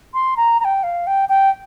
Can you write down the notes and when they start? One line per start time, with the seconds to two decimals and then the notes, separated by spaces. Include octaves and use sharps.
0.14 C6
0.37 A#5
0.60 A#5
0.65 G5
0.83 F5
1.07 G5
1.29 G5